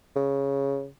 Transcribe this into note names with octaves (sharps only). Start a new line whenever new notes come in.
C#3